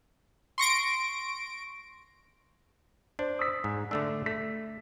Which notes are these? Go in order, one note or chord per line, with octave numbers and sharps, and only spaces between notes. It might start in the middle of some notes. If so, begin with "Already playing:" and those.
C6 C#6 A#6 D7
D4 C5
D#6 E6 B6
G#2
D3 A3 D4 E6
A3 B6